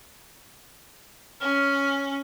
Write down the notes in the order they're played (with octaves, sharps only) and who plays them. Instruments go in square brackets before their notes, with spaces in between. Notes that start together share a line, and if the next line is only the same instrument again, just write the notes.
[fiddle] C#4 [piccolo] F6